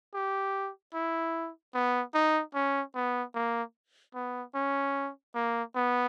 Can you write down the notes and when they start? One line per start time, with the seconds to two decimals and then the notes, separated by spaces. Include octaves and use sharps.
0.14 G4
0.94 E4
1.74 B3
2.14 D#4
2.54 C#4
2.95 B3
3.35 A#3
4.14 B3
4.55 C#4
5.35 A#3
5.75 B3